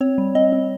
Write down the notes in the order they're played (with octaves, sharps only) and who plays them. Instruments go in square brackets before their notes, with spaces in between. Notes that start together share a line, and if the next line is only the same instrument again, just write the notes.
[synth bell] C4 C#5
G3
C4 D#5
C4